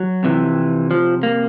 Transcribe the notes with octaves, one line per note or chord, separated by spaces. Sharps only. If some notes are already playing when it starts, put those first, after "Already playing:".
Already playing: F#3
F2 C3 E3
F3
A#3